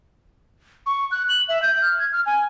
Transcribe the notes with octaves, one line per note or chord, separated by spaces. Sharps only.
C#6
F#6
F#7
E5
G6
F6
G#6
F6
G#5